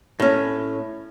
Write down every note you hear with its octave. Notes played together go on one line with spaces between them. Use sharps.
A2 C#4